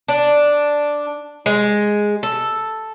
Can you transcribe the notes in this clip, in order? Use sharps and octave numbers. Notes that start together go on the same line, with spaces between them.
D4
G#3
A4